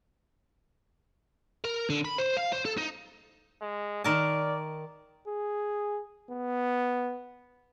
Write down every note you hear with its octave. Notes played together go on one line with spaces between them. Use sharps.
A#4
D3
B5
C5
F5
C5
A4
D#4
G#3
D#3 A#4 D5 A5
G#4
B3